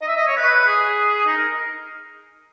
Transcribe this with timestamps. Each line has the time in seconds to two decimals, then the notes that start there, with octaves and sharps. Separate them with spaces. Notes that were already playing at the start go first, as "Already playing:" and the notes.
0.01 D#5
0.08 E5
0.17 D#5
0.27 C#5
0.37 B4
0.67 G#4
1.26 D#4
1.37 A#4